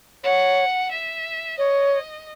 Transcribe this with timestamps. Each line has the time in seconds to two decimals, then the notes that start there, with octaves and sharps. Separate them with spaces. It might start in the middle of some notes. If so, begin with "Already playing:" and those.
0.24 C#5 F#5
0.91 E5
1.58 C#5 D#5